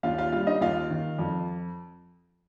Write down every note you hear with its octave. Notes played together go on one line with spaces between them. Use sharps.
D#2 F4 F5
F4 F5
G3 F4 F5
D#4 D#5
D#2 F4 F5
D#3
F2